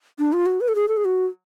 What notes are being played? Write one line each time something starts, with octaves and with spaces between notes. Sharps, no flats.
D4
F4
F#4
B4
A4
G#4
A4
G#4
F#4